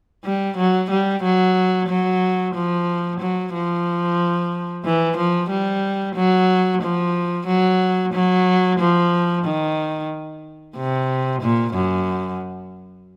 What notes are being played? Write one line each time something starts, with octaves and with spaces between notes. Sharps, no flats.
G3
F#3
G3
F#3
F#3
F3
F#3
F3
E3
F3
G3
F#3
F3
F#3
F#3
F3
D#3
C3
A#2
F#2